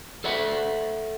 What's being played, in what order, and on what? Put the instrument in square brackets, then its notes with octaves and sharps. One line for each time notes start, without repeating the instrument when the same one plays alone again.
[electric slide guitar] A4 D5 E5 F#5